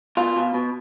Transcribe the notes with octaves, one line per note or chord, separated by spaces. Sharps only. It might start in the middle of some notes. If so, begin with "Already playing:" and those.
B2 F4
B2
B2